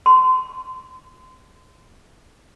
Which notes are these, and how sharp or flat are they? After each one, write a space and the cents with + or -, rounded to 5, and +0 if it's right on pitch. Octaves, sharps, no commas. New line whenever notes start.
C6 -30